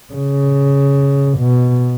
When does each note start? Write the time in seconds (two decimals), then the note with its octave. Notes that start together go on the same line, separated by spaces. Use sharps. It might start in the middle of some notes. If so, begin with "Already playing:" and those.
0.14 C#3
1.39 B2